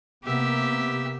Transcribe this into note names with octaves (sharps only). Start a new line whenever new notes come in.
C3 A#3 B3 G4 E5